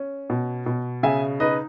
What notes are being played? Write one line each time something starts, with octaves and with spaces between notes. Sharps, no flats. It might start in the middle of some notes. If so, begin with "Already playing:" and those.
Already playing: C#4
B2
B2
C#3 E5 G#5
D#4 B4 D#5